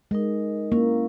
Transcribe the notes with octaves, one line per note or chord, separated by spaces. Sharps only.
G#3 D#4 A#4 D#5
A#3 C#4 E4 A#4